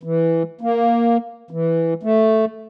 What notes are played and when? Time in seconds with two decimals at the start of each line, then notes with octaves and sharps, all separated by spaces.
0.03 E3
0.61 A#3
1.51 E3
2.03 A3